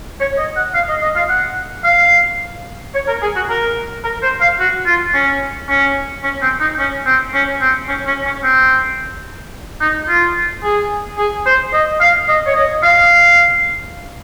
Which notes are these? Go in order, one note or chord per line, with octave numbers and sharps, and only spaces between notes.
C#5
D#5
F#5
F5
D#5
D#5
F5
F#5
F5
C#5
A#4
G#4
F#4
A#4
A#4
C5
F5
F#4
F4
C#4
C#4
C#4
C4
D#4
C#4
C4
C#4
C4
C#4
C#4
C#4
C4
D#4
F4
G#4
G#4
C5
D#5
F5
D#5
C#5
D#5
F5